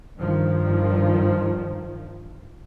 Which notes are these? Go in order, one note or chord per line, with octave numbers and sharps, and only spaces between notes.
G2 D#3 F3